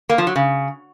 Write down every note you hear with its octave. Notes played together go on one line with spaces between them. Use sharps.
A#3
F3
F#3
C#3